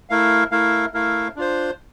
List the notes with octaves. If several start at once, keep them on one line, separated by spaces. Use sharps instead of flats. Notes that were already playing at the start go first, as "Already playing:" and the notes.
A3 E4 A#4 F5
A3 E4 A#4 F5
A3 E4 A#4 F5
D4 F4 C5